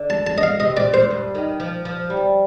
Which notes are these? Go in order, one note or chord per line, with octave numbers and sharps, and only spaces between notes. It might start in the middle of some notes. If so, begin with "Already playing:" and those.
Already playing: D3
A5
A5
D#5
F5
C3 D#5
A#2 D5
A#2 C5
G2
D#3
F3
F3
G3